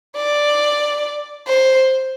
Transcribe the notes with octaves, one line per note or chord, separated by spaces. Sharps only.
D5
C5